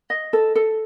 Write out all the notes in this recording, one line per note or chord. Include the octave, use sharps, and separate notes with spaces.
D#5
A4
A4